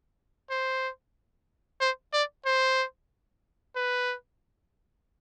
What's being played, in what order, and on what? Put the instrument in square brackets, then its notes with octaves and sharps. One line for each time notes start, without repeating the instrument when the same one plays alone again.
[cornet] C5
C5
D5
C5
B4